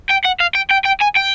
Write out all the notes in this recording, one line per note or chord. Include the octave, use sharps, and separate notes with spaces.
G5
F#5
F5
G5
G5
G5
G#5
G5